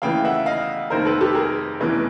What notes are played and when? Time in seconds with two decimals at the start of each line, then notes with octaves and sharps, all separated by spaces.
0.02 D#2 C#3 E3 A3 F5 G5
0.25 E5 F#5
0.46 D#5 F5
0.90 F1 D#2 D#3 A#4 C5
1.05 A4 B4
1.21 G4 A4
1.35 G#4 A#4
1.80 F1 E2 C#3 E3 A3